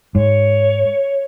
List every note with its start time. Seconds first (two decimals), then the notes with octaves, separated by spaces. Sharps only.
0.15 G#2 C#5